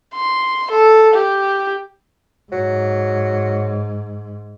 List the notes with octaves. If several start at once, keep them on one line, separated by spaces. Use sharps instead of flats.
C6
A4
G4
G#2 F#3